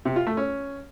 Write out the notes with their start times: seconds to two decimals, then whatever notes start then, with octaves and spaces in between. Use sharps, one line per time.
0.05 C3
0.16 F4
0.27 A3
0.37 C#4